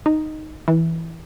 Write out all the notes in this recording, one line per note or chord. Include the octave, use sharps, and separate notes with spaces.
D#4
E3